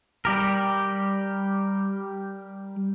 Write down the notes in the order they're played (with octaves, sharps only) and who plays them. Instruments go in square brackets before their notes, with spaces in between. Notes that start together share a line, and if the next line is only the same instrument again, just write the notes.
[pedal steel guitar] G3 G4 A#4